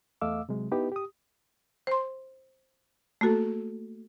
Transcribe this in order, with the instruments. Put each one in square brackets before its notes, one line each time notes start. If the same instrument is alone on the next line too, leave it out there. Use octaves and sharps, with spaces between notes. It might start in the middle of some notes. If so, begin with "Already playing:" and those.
[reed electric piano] E2 A3 D#5 F5 D6 E6
C3 F#3 G#3
B3 D#4 E4 G4 B4
G4 D#6
[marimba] C5 C6
A3 A#3 F#4 A4